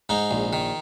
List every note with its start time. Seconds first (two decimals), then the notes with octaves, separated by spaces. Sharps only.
0.09 G#2 D#4
0.31 A#1
0.53 D#3